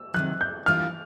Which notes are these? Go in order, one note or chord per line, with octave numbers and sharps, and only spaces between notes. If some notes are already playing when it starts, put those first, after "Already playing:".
Already playing: E6
C3 D#3 F#3 F#6
G6
E3 G3 A#3 D4 F4 F6